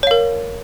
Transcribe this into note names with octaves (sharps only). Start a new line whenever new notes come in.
A#4 C#5 F5